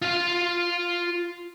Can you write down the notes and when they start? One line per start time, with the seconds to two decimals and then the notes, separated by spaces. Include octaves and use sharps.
0.02 F4 F5